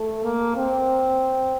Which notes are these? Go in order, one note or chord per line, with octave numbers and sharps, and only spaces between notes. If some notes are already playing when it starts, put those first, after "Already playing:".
Already playing: A3
A#3
C4